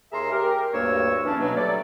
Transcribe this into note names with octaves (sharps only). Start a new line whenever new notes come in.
D#2 G#4 A#4 E5 A#5 C6
G4 A#4
D2 G2 A#3 C#5 C#6 E6
E2 E3 A#3 C#4 D4
B2 F#3
G3 A3 A4 D5